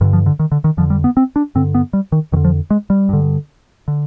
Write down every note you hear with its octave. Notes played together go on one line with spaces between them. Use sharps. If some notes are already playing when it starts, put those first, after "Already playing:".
G2 D3 D#3
F3
D3
D#3
D3
D#3
F2 D3 F3
G3
B3
C4
D4
G2 D3 C4
B3
G3
D#3
F2 D3 D#3
F3
G#3
G3
G2 D3
D3